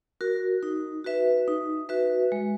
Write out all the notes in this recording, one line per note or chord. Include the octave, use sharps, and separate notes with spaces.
F#4 A#4
D#4
F#4 B4 E5
D#4
F#4 B4 E5
G#3